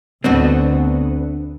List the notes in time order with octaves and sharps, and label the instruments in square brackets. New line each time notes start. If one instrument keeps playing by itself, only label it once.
[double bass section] D2 [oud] B3 D4 F#4 [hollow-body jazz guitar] C4